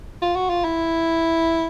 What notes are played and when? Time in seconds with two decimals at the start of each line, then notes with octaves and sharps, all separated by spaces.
0.22 F4
0.36 F#4
0.50 F4
0.64 E4